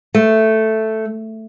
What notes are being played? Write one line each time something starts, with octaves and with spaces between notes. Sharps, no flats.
A3